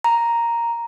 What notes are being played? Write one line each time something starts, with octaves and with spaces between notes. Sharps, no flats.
A#5